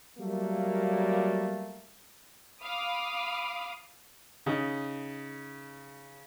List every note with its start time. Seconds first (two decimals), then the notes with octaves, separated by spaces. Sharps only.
0.18 F#3 G3 A3 A#3
2.63 F5 B5 D6 D#6
4.46 C#3 D#4